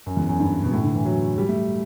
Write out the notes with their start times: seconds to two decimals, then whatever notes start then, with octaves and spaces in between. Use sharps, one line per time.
0.06 F#2
0.17 E2
0.29 F#2
0.40 G2
0.63 B2
0.72 A2
0.84 D3
0.94 E3
1.05 F#3
1.38 G3
1.49 A3